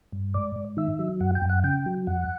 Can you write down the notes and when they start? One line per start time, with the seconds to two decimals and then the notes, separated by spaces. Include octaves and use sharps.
0.12 G2
0.34 G#2 D5
0.56 G#2
0.77 D#3 E5
0.99 F#3
1.20 F#2 F#5
1.35 G5
1.42 F#2
1.49 F#5
1.64 C#3 G5
1.86 F#3
2.07 F2 F#5